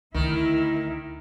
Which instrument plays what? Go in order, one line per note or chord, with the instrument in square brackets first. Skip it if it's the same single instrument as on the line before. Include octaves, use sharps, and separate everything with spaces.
[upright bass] D2 [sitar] D#3 [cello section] E4 A#4